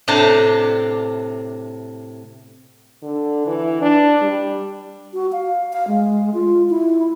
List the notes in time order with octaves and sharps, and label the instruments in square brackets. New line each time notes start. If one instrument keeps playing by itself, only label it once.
[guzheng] A2 C3 D4 C5 A5 A#5
[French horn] D3
E3
D4
G3
[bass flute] F#4
F5
F5
G#3
F4
E4